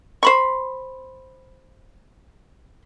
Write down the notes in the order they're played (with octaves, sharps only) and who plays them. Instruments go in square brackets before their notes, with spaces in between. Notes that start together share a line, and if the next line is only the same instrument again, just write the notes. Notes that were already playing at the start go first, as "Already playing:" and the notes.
[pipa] C5 B5 C#6